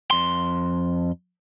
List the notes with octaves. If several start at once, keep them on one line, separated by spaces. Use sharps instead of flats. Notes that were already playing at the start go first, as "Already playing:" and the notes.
F2 C6